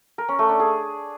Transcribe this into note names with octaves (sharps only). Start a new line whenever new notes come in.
A#4
C#4
A3
D4
G#4